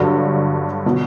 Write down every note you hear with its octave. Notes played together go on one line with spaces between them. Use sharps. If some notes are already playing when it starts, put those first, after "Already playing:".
Already playing: G2 D3 F#3
B2 F#3